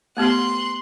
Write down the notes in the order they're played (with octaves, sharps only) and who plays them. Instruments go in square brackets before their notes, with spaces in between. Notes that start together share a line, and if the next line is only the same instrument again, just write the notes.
[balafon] A3 B3 G4 [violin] C6 F#6